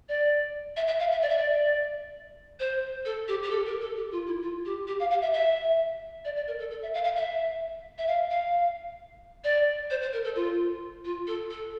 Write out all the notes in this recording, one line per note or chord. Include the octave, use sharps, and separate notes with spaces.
D5
E5
E5
F5
E5
D5
E5
D5
C5
A4
G4
G4
A4
A#4
A4
G4
F4
E4
F4
G4
G4
F5
F5
E5
E5
D5
D5
A#4
A4
A4
E5
F5
F5
E5
E5
F5
F5
D5
C5
C5
A#4
A4
F4
F4
A4
A4